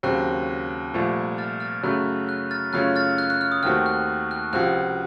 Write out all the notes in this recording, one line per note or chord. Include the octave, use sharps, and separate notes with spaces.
D#2 C#3 F#3 C4 F#6
C2 A#2 F3 A3
F6 A6
F6 A6
F#2 C#3 F#3 A3 F#6
F#6
F6 A6
F#2 C#3 A3 C#4 F4 F#6
F6 A6
F#6
F#6
F6
D#6
D#2 D#3 A3 C4 F#4 F6
F#6
F#6
C#2 C3 F3 C4 F#4 F#6